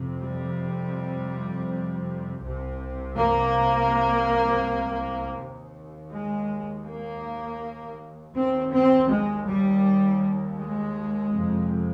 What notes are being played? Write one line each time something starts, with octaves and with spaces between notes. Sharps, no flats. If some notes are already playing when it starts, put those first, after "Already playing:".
Already playing: F2 C3
G3
C2 C3
A#3
D#2
G#3
A#3
D#2 C4
C4
G#3
G3
G#3
F2 C3